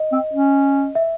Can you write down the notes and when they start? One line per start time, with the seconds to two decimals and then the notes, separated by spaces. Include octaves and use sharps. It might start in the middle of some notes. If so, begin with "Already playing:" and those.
Already playing: D#5
0.12 C4
0.33 C#4
0.95 E5